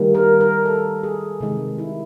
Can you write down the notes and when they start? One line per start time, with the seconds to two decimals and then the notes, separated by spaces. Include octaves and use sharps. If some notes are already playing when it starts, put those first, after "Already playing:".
Already playing: D#3 G3 A#3
0.15 A#4
0.41 A#4
0.66 A4
1.03 G#4
1.41 C3 D#3 G#3
1.78 E4